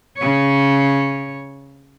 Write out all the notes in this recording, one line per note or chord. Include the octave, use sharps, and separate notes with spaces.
C#3 C#5